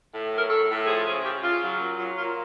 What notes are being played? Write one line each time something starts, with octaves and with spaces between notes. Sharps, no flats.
A2
F#3
A#4
A2 A4
A2
F3 G#4
C#3 G#4
C#3 G4
C#3 F4
F#3
A#2
F#3 F4
A#2 F4